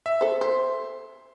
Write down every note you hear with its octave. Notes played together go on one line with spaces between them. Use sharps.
E5
A4 C5
C5 C6